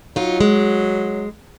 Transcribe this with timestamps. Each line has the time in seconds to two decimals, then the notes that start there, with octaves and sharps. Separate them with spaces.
0.16 F#3 D#4 F4
0.41 G#3